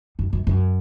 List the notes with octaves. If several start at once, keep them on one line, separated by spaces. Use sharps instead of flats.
F#2
F#2
F#2